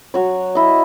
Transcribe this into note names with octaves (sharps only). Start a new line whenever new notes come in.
F#3 F#4 C#5
E4 D#5